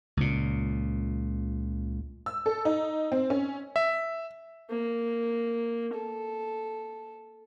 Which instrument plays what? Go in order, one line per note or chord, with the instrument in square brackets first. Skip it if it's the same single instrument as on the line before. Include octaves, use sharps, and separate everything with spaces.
[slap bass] C#2 A#2
[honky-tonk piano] E6
A4
D#4
C4
C#4
[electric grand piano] E5
[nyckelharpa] A#3
A4